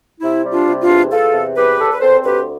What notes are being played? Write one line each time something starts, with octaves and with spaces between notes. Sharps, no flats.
C3 E4
G3
D4 F4
C3
D4 F4
E2
E2 F4 A4
C3
E2 G4 B4
E2 A4
B4
C4 A4 C5
D2 G4 B4